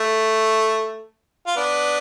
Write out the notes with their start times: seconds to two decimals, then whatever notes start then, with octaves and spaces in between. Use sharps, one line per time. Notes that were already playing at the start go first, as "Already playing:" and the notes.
Already playing: A3
1.46 F4
1.56 B3 D4